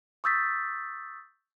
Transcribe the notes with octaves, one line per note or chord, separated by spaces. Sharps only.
C#6 D#6 E6 G6 A6 B6